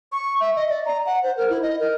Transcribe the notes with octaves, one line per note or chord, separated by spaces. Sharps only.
C#6
E5
D#5
D5
A#5
F#5
C5
A#4
E4
D#5
A#4